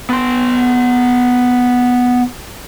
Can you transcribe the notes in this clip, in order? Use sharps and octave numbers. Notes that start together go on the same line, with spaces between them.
B3 C6